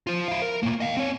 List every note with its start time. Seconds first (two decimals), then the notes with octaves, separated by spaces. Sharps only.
0.07 F4 C5
0.28 E4 F5
0.42 A#4
0.63 A2 A#3
0.80 D#5 F5
0.97 C4 C#5